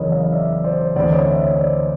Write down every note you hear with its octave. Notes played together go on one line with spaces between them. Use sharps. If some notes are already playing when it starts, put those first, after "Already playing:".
Already playing: F#1 E2 C#3 E3 A#4 C#5 D#5
D#5 F5
D5 E5
C5 D5
D2 C3 E3 C5 D5
C#5 D#5
D5 E5
C#5 D#5
C5 D5